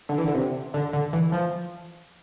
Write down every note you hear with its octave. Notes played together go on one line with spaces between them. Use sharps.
D3
E3
D3
C3
D3
D3
E3
F3